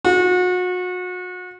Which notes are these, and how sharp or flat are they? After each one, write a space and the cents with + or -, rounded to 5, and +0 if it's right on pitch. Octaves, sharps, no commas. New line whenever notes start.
F#4 -35